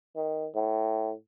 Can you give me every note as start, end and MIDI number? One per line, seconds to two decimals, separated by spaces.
0.16 0.48 51
0.55 1.13 45